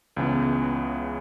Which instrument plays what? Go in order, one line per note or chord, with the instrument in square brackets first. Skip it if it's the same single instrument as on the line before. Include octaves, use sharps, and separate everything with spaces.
[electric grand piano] C#2 C#3 E3 B3